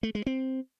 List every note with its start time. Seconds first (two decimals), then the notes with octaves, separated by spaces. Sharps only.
0.03 A3
0.15 G#3
0.26 C4